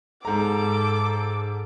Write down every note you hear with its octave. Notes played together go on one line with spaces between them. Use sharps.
G#2 A4 A#5 D6